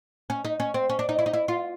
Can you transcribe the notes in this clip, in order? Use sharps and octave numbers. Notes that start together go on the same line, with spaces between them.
C#4
D#4
C#4
C4
C#4
D4
D#4
E4
D#4
E4
F4